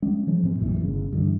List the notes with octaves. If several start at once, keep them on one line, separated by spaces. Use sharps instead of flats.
G#3 C#4
E3 F3 G#3
A2 C4
A#1 F#2 A#2 E3
G1 C#3
G2 D3 E3